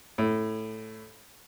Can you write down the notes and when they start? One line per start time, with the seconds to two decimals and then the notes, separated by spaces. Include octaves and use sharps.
0.18 A2